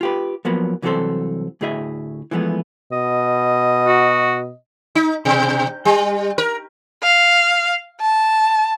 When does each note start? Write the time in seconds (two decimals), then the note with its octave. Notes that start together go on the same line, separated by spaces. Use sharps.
0.01 F4 G4 B4
0.45 F3 F#3 A#3 B3
0.82 C2 E3 F#3 C4 A4 C5
1.61 D2 A2 E4 G#4 D#5 E5
2.31 E3 F3 G#3 A3 B3
2.92 B2 D#5
3.87 F#4
4.95 D#4
5.25 B2
5.85 G3
6.38 A#4
7.03 F5
8.01 A5